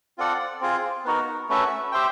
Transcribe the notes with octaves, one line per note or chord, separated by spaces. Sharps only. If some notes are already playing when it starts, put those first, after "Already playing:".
C4 F4 A4 D5 F#5
C4 F4 G#4
B3 D#4 F#4 A#4
A3 C#4 F#4 B4 E5
G4 C5 E5 G5